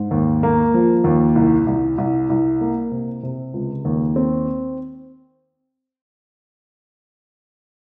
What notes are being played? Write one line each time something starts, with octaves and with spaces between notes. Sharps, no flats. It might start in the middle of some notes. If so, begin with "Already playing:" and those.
Already playing: G#2
D#2
A#3
F3
D#2
C2
C2
C2
C2
A#3
C3
C3
C#2
D#2
C4